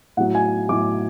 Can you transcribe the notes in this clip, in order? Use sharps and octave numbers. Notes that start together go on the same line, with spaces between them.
A2 F#3 F#5
G#5
A2 F#3 D6